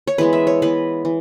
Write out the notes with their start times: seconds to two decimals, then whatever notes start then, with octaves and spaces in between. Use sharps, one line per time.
0.07 C#5
0.18 E3 G#3 B3 B4
0.33 E5
0.47 C#5
0.62 E3 B3 B4
1.05 E3